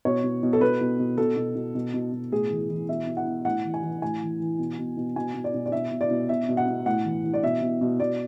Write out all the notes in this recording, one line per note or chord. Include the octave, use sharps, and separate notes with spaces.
B2 C#5
B2
B2
A4
B2 B4
B2
B2
B2 A4
B2
B2
B2
B2
B2
A2 G#4
E3
E3
B2 E5
B2
F#5
B2
A2 F#5
E3
G#5
E3
A2 G#5
E3
E3
B2
B2
B2
B2 G#5
B2
D5
B2
D5
B2 E5
B2
D5
B2
B2 E5
B2
F#5
B2
A2 F#5
E3
E3
D5
B2 E5
B2
B2
B2 D5